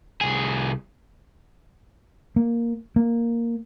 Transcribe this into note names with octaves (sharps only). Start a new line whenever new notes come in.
C2 G#4
A#3
A#3